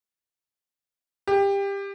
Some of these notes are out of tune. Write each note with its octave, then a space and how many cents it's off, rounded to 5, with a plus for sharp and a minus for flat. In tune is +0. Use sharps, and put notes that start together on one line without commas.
G4 +20